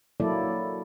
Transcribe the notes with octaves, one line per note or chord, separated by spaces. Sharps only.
F#3 A#3 E4 A4 D5